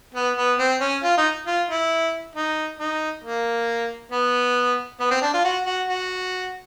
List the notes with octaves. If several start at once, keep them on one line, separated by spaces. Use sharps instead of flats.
B3
B3
C4
C#4
F4
D#4
F4
E4
D#4
D#4
A#3
B3
B3
C4
D4
F4
F#4
F#4
F#4